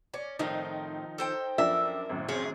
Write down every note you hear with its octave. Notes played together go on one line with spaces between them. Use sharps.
C#4 D5
A2 D#3 F3 C4 D#4
A4 C5 G5
F#2 F3 D4 A#4 E5
G#1 F#2 A2
F3 C4 C#4 G#4